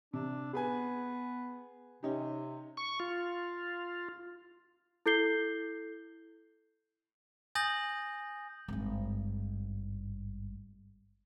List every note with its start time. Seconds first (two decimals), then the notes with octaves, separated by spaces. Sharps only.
0.13 C3 D4
0.53 B3 G#4 B4 G#5
2.03 C3 C#4 D#4 G4
2.77 C#6
3.00 F4
5.06 E4 A4 G6 C7 G7
7.55 G#5 D#6 G6 A6 A#6 F#7
8.68 G#1 G2